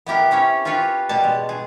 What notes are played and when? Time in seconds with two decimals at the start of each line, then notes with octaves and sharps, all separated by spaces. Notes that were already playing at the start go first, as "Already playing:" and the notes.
0.06 B3 E4 G4 A#4
0.31 C4 C#4 E4 C#5
0.65 F4 G4 B4 C#5
1.09 B2 G3 A5
1.24 G#3
1.49 G#4